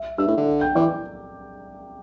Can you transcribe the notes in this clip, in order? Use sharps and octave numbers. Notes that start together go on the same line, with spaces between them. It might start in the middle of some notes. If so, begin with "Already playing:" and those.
Already playing: E5
G2 E5 E6
A2
D3
G5 G6
E3 D5 D6